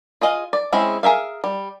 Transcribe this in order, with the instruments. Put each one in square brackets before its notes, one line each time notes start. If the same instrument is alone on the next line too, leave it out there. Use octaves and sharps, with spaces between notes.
[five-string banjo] F4 G#4 D#5 F5
D5
G#3 C4 C#4 E4 G#4
G#4 A#4 E5 F5
G3